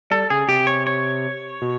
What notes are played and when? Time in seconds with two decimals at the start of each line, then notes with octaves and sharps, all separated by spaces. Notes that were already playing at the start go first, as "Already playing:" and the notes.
0.11 G3 A4
0.30 C#3 G#4
0.48 C3 G4
0.67 C#5
0.87 C#5
1.62 B2